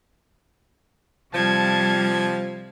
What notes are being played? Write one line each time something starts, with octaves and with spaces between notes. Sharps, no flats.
C3 F3 G3 A5 G#6